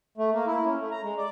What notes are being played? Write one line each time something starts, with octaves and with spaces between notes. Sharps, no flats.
A3
A#3
E4
C#4
A3
A#5
G#3
D5